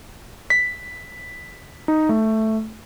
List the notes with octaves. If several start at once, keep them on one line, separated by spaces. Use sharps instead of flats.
B6
D#4
A3